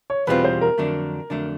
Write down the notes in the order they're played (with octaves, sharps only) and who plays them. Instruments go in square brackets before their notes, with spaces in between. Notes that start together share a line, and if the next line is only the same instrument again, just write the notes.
[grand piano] C#5
[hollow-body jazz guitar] E2 B2 G3 C4 F4 [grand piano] B4
[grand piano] C5
A#4
[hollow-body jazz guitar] F2 D3 F#3 A3 D4
F2 D3 F#3 A3 D4